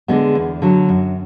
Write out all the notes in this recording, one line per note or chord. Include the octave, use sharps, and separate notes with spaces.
D3 G#3 B3
E2
D3 F#3
F#2